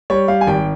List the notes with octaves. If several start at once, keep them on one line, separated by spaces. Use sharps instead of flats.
G3 C#5
G3 F5
G#5
G#1 G5